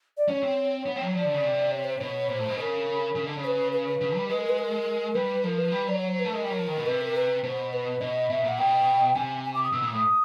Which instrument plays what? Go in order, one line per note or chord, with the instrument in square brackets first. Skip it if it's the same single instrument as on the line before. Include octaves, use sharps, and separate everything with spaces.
[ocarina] D5
[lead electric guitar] C#4 [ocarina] C#5
[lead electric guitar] C4
B3
C4
F3
F#3
[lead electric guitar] F3 [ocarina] D5
[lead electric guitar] D3
C#3
C3
[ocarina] C#5
C5
[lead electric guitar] B2 [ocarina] C#5
[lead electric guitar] A#2 [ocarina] C5
[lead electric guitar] A2
B2
[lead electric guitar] C#3 [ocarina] A#4
[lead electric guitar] C#3
D3
C#3
[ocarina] C5
B4
B4
B4
[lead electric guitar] C#3
G3
[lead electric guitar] G#3 [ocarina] B4
[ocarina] A#4
B4
A#4
[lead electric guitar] G3 [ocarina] B4
[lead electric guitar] F3 [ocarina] A#4
[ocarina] B4
[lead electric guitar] G3
[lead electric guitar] F#3 [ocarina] D5
[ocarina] C#5
C5
B4
[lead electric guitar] A3
[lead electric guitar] G#3 [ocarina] A#4
[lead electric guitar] G3
F#3
F3
D#3
B2
[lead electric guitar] C3 [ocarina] B4
[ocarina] A#4
B4
[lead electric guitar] B2 [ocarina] C5
[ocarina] B4
[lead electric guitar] B2 [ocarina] D#5
[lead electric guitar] B2 [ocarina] E5
[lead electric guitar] A#2
[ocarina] F#5
[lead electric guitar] B2 [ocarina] G5
[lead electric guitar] C3 [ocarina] G#5
[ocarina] G#5
D6
D#6
[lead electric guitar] B2 [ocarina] E6
[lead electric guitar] A#2 [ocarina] D#6
[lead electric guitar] A2